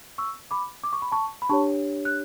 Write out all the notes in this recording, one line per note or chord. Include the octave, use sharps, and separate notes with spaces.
C#6 E6
B5 D6
D6
C#6
B5
A5 C#6
B5
D4 G4 C#5 A5 C#6
F#6